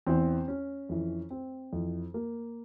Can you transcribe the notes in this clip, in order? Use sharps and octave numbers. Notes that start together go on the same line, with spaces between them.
E2 E3 C4
C#4
F2 E3
C4
F2 E3
A#3